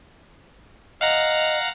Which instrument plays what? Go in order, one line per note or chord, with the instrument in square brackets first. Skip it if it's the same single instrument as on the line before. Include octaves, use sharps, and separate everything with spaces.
[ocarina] D#5 [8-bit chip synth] F5 F#5 A#5